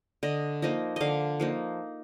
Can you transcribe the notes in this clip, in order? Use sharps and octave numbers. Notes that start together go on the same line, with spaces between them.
D3 D#5
F3 A#3 D#4 D#5
D3 D#5 F5
F3 A#3 D#4